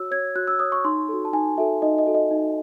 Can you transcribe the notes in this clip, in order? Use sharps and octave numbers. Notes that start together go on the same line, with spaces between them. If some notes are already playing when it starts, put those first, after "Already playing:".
Already playing: F#4 C#5 E6
C#5 G#6
F#4 F#6
E6
C#5 D#6
C#6
D#4 C6
F#4 A4
A5
D#4 G#5
F#4 A4 E5
D#4 D#5
D#5
F#4 A4
D#5
D#4